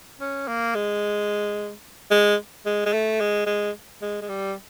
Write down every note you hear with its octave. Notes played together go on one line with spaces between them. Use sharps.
C#4
A#3
G#3
G#3
G#3
G#3
A3
G#3
G#3
G#3
G#3
G3